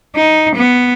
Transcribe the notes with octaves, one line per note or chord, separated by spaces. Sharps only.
D#4
B3